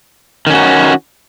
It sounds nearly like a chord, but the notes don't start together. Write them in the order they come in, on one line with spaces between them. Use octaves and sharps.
D#3 C#4 F#4